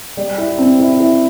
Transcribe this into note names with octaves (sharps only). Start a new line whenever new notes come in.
G3
E4
C4
E4
E4